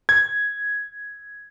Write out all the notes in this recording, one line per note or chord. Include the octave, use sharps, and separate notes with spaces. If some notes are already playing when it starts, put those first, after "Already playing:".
G#6